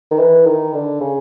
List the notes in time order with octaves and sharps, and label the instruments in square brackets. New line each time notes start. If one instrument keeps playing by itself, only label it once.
[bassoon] D#3
E3
D#3
D3
C#3